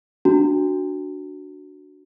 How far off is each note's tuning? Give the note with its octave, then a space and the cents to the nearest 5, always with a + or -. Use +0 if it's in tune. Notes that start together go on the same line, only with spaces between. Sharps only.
D4 +0 F#4 +0 A#5 -45